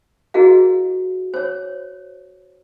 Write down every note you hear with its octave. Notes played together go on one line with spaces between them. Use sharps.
E4 F#4 G#4 A#4 D#5 F5
C5 C#5